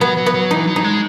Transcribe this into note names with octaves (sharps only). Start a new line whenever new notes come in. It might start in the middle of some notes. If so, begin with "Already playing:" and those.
F#3 B3
F#3
B3
F#3
E3 D#4
F#3
D#4
G#3